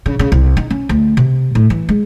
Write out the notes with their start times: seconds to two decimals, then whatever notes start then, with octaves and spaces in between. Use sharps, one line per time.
0.06 C#3
0.19 C#3
0.32 C2
0.57 D#4
0.70 C#4
0.89 D2
1.17 C3
1.55 A2
1.70 E3
1.89 G#3